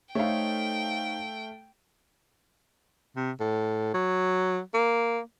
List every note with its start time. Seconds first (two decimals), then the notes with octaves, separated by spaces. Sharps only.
0.15 A3 D#4 A4 C5 C#5 F5 G5
3.16 C3
3.40 A2
3.94 F#3
4.74 A#3